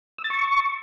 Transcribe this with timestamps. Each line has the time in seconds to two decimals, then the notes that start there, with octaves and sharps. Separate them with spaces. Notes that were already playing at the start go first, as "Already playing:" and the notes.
0.18 E6
0.24 A6
0.30 C#6